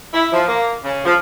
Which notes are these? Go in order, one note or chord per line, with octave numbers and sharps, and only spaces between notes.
E4
F3
A#3
C#3
F3